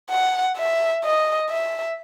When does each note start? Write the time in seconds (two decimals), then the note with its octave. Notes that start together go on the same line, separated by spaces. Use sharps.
0.11 F#5
0.57 E5
1.04 D#5
1.51 E5